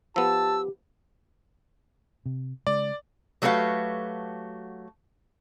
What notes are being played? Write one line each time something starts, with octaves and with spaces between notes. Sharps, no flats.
F3 B3 G4 A5 E6
C3
C#3 G#3 D5
F#3 A3 F#4 G4 B4 F5